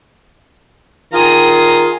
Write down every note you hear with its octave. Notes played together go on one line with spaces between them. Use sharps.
D#3 F4 G#4 A#5 D#6